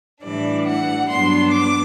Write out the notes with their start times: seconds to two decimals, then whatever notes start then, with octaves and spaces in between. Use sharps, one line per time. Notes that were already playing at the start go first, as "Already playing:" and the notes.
0.23 A2 E3 G3 D4 D5
0.67 F#5
1.08 G2 F#3 B3 D4 C6
1.51 D6